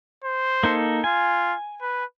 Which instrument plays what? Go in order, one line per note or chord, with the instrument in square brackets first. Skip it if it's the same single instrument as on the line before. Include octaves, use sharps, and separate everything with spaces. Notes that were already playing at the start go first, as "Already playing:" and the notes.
[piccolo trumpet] C5
[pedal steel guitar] A#3 D#4 A4
[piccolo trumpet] F4 [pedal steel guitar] G#5
[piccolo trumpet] B4